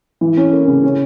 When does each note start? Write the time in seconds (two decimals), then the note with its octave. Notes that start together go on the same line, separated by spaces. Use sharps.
0.21 E3
0.37 C#4
0.53 A#3
0.68 C#3
0.83 C#4